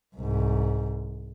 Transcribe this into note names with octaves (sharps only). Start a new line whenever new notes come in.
C2 G#2